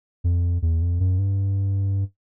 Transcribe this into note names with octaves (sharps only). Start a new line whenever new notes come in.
F2
E2
F2
F#2
G2